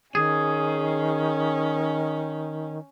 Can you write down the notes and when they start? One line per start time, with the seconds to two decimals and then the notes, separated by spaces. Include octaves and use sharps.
0.15 D#3 C#4 G#4